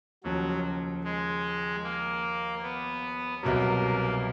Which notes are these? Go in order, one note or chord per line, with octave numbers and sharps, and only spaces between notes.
D#2 C#3 F3 F#3
G#3
A#3
B3
C2 B2 F#3 A#3